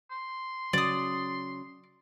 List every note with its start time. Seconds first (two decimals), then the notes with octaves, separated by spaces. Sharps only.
0.11 C6
0.73 C#3 F#3 D5 D#6